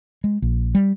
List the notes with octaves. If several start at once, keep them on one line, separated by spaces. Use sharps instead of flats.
G#3
A#1
G3